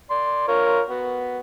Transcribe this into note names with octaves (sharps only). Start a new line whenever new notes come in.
D5 C6
F4 A#4 C#5
B3 F#4